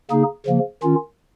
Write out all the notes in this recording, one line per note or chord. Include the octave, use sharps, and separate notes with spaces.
C#3 A#3 D#4 G#4
C#3 F3 A#3
D#3 C#4 F4